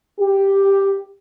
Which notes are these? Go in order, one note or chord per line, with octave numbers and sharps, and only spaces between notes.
G4